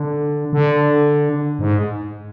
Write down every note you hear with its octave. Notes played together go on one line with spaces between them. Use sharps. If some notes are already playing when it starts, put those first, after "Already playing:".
Already playing: D3
D3
G#2